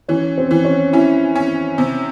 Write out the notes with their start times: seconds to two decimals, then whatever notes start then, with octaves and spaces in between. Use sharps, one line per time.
0.08 E3 C#4
0.38 C4
0.51 E3
0.65 C#4
0.93 C#4 E4
1.35 C#4
1.78 C3